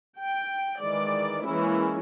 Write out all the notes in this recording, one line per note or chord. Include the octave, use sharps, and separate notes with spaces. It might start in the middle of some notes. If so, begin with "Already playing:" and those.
G5
D#3 E3 G#3 D5
E3 G#3 A#3 C#4 E4